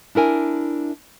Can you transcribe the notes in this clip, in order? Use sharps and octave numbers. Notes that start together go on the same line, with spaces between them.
D4 E4 A#4 G#5